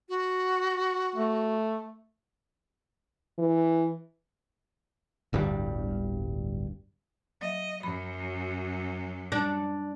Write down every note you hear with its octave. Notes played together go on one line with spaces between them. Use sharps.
F#4
A3
E3
D1 G1 G2 G3
F#3 D#5 E5
F#2 F#3 B5
G3 D4